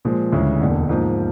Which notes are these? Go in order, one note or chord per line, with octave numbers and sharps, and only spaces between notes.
A#2 F3 G#3
D2 C#3 E3 G#3 C#4
E1 D#2 D3
G#2 F3 A#3